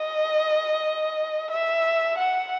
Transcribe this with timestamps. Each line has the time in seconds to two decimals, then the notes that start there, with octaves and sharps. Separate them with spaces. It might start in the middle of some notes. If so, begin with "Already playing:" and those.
Already playing: D#5
1.51 E5
2.18 F#5